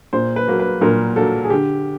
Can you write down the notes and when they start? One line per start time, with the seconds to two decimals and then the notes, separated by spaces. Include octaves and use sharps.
0.13 A#2 C5
0.36 B4
0.48 F#3 A#3
0.60 B4
0.81 A#2 A#4
1.16 F#3 A#3 A4
1.44 G#4
1.50 D3 G4